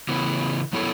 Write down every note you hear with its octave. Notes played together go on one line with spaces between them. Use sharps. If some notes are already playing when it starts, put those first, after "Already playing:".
C#3 E3 B3
F#3 B3 E4 A4 C#5